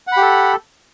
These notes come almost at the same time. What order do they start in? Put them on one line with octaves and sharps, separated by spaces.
F#5 B5 G4 A4